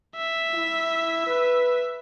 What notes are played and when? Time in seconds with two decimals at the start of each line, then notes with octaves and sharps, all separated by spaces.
0.17 E5
0.54 E4
1.27 B4